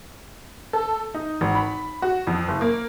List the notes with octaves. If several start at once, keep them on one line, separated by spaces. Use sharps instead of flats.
A4
D#4
G#1
B5
F#4
F2
F#1
A#3